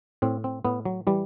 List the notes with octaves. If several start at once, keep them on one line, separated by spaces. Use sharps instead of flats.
A2 C4
C4
A2 B3
F#3
E3 G3